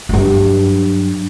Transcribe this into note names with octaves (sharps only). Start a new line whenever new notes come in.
G2 F#3